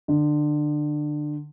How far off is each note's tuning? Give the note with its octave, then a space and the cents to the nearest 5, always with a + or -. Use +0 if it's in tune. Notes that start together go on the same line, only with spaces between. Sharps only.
D3 +25